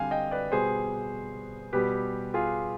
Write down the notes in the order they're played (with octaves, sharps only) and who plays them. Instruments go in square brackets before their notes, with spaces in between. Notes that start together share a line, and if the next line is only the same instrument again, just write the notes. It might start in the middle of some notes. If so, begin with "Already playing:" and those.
Already playing: [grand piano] D3 G3 C4 F5 G#5
D#5 G5
B4 D5
B2 G3 B3 G#4 C5
B2 G3 B3 G4 B4
F4 G#4